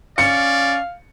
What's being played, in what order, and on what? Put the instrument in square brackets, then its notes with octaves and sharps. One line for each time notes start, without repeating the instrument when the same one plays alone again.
[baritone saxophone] C#4 [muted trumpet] D5 [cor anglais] F5 [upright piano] C#7